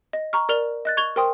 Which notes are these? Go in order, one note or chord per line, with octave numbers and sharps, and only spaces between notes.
D#5
A#5 C#6 F6
A#4 D5 F6 F7 G7
D#5 F#6 A6
C#6 G#6 F7 G7
A#4 C5 G5 C6 D#6